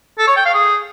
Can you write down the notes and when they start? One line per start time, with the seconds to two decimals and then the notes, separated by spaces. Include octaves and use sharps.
0.19 A4
0.27 C#5
0.36 G5
0.45 F5
0.54 G#4